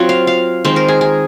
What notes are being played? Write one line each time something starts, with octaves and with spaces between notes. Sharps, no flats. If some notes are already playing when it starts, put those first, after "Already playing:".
Already playing: F#3 C4 F4
F5
F5
D#3 G#3 C4 C5
A#4
G#4
G#4